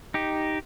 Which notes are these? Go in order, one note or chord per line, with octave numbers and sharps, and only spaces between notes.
D#4 G4